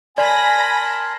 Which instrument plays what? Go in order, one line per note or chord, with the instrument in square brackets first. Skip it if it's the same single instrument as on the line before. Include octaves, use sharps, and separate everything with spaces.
[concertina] A#4 A5 C6 [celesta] D5 [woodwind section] G#5 [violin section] B5 A#6